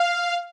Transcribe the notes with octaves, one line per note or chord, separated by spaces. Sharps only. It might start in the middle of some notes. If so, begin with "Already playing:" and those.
Already playing: F5